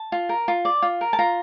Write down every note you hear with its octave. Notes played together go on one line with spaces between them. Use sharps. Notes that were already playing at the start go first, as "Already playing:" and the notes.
Already playing: A5
F4
A#4
F4
D5
F4
A#4
A5
F4 A#5